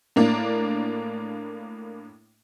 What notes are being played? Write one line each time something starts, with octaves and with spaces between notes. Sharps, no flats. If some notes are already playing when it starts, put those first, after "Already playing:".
A2 A#3 D4